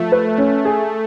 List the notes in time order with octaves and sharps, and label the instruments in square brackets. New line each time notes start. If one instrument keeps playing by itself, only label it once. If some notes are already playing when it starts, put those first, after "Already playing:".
Already playing: [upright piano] F3 [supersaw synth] A3
[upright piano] B4
C#4
G#4